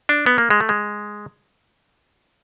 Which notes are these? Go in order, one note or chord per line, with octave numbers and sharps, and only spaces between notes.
D4
B3
A#3
G#3
A3
G#3